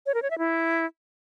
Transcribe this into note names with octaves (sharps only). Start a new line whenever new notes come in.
C#5
A#4
C#5
E5
E4